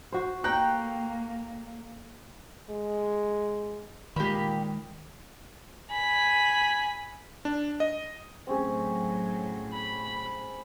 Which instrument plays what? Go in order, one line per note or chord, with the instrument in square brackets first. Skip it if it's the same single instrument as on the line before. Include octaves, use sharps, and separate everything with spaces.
[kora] F#4 C5
[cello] A#3 [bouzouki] A4 G5 [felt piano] A#5 F#6
[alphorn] G#3
[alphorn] A#2 [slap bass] D#3 G#3 [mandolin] G4 B5
[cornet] G#5 [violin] B5
[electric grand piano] D4
D#5
[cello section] A2 F#3 [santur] C4 C#4 G#4
[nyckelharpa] B5